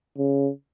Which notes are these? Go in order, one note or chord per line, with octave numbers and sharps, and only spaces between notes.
C#3